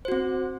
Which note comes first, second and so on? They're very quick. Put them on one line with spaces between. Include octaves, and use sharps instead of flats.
C5 F#4 C4